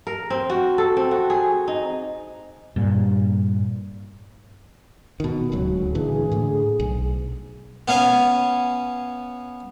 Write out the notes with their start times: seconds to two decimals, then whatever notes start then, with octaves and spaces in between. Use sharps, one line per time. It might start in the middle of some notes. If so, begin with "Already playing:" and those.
0.07 A#4
0.30 C4
0.50 F#4
0.78 A4
0.97 C4
1.11 F#4
1.30 G#4
1.68 D#4
2.76 G2 A#2
5.20 B2 D#3
5.52 D1 C#2 F#3
5.95 A#2 D3 E3 G#4
6.32 A2 D3
6.80 B1
7.88 B3 C#4 F5 G#5